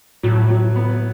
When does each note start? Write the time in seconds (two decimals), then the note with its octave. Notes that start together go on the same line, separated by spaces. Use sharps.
0.23 A2 F#3
0.50 F#3
0.76 B3